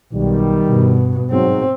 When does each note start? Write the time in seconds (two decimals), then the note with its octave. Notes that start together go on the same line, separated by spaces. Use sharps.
0.13 B1 D#3 G3
0.67 G2 B2
1.30 G#2 F#3 C4